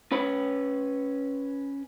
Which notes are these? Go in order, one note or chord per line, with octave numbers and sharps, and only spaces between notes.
C#4 B4 C#5 B5